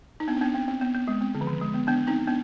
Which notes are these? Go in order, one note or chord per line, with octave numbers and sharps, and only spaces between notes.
D#4
B3 D4
C4
B3 D4
C4
C4
B3
B3
G#3
C4
D3
F3
D#3
G#3
B3
B3 D4
C4 D#4
B3 D4